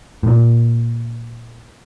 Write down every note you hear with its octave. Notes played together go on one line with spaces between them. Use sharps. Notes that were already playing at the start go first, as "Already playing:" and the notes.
A2
A#2